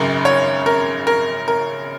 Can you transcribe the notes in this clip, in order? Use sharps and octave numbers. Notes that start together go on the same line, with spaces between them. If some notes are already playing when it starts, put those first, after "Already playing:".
Already playing: G#1 F#2 C#3 A#4
C#5
A#4
A#4
A#4